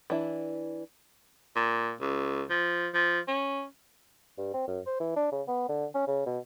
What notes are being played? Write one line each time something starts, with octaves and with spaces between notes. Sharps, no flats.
E3 D4 E4
A#2
C#2
F3
F3
C#4
G2
C4
F#2
C5
E3
D4
C#3
B3
D3
C#4
C#3
B2